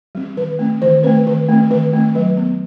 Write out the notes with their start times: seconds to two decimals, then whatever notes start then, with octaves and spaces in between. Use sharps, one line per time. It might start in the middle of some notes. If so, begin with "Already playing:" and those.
0.15 G3 C4
0.37 D#3 B4
0.59 A3 C4
0.82 D#3 C5
1.04 A3 C4 B4
1.26 D#3 B4
1.49 A3 C4
1.70 D#3 B4
1.93 A3 C4
2.15 F#3 B4
2.37 B3